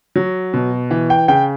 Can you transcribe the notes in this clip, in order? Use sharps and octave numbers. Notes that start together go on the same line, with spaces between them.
F#3
B2
E3
G5
C#3 G5